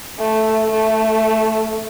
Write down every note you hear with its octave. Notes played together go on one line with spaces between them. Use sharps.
A3
A3